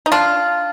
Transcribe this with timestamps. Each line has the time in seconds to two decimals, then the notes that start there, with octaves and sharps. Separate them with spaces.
0.06 D#4
0.12 D4 F4